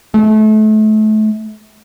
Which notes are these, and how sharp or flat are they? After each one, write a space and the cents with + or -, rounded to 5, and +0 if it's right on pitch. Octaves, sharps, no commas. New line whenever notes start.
A3 -30